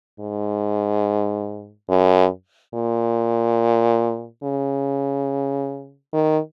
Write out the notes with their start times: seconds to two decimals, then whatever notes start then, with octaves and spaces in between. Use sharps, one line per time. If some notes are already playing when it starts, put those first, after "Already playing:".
0.20 G#2
1.89 F#2
2.74 A#2
4.44 C#3
6.13 D#3